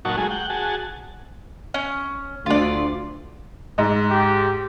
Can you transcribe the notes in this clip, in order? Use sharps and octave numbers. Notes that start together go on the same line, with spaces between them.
A#2 F#3 D#4 F#4 A5 C#6
F#3 G#3 A3 G#4
F#5 G5
F#4 G#4 A5
C#4
D2 F4 D5
G#2 D#5
G4